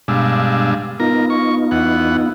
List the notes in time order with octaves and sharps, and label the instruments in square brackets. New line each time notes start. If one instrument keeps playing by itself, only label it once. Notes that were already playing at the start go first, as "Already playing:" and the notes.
[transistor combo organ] G2 G#3 D4 [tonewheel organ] B2 F5 E6
[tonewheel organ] B3 D#4 F4 [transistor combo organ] A#4
[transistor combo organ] C#6
E2 F#5